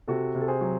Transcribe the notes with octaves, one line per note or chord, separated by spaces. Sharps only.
C3 F#4 A4
C3
A4
G#4 C5
F#3